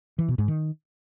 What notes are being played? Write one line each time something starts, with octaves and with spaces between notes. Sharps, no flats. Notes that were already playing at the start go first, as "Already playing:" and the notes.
E3
B2
G#2
D#3